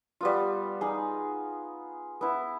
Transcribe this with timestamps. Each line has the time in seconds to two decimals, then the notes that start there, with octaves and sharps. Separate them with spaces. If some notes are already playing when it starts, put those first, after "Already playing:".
0.21 G3 B3 F4
0.81 D#4 G#4
2.21 B3 E4